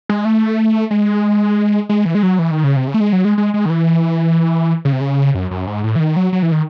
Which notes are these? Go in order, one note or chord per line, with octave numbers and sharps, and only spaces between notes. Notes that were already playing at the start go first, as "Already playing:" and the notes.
G#3
A3
G#3
G#3
E3
G#3
F#3
E3
D#3
C#3
C3
C#3
A3
G#3
F#3
G#3
G#3
G#3
D#3
E3
C#3
C3
C#3
F#2
F#2
G#2
A2
E3
D#3
F#3
F#3
E3
D#3